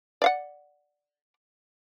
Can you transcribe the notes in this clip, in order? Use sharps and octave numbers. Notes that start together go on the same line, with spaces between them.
D5 F5 F#5